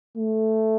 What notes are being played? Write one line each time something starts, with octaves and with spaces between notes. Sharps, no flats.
A3